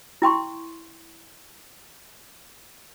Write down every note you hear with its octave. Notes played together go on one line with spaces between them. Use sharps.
E4 G5 C6 C#6